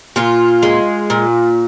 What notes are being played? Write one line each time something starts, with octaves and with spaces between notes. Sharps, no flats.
A#2 F4
G#3
A#2